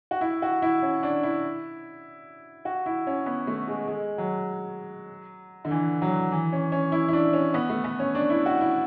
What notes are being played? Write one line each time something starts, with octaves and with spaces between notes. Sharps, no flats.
F#4
E4
F#4
E4
C#4
D4
E4
F#4
E4
C#4
B3
A3
G#3
G#3
F#3
D3
E3
F#3
E3
C#4
C#4
E4
E4
D4
C#4
B3
A3
B3
C#4
D4
E4
F#4
E4